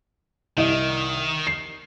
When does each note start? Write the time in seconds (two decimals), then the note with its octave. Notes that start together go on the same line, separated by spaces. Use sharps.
0.57 C2 D#3 D#5 E7
1.47 C7